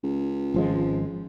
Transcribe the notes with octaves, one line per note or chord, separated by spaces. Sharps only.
C#2
G#1 F3 G#3